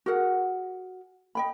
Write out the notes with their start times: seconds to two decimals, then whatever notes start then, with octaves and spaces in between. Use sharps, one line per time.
0.06 F#4 G#4 A#4 F#5
1.35 D#5 G5 B5